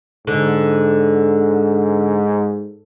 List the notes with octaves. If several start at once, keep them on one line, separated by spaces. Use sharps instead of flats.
G#2 D3